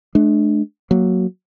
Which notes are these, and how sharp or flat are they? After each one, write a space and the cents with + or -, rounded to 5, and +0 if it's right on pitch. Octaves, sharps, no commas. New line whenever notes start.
A3 -45 D4 +20
F#3 +0 A#3 +0